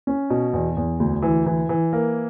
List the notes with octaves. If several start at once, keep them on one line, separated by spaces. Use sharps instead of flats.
C#4
B2
E2
E2
D2
E3
E3
E3
A#3